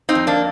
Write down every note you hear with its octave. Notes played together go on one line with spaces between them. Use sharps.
C4 D#4
F2
A#3 D4